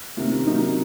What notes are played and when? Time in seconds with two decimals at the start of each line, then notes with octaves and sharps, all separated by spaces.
0.17 C3 D#3 A#3 C#4
0.47 C3 F#3 A#3 C#4 D#4